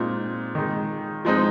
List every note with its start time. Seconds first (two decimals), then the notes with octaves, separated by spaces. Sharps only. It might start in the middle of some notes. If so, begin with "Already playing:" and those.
Already playing: A#2 G#3 C4 D#4
0.55 D#3 G#3 D#4
1.25 F3 G#3 C4 D#4